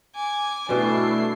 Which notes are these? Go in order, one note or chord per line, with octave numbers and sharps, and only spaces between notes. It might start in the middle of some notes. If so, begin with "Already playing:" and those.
G#5 D6
B2 G3 A3 D4 E4 C7